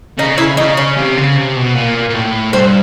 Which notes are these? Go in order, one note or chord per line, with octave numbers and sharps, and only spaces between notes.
C#3 D#4
E4
C#3 D#4
C#4
C3
C#3
C3
B2
A#2
A#2
A2
G2 C4